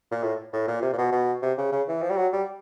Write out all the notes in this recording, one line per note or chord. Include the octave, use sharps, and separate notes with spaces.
A#2
A2
A2
A#2
C3
A#2
B2
B2
C3
C#3
C#3
E3
F3
G3
F#3
G3